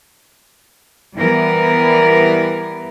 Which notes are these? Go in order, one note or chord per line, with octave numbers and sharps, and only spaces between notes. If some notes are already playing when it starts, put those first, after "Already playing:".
E3 G3 B3 E4 A#4 B4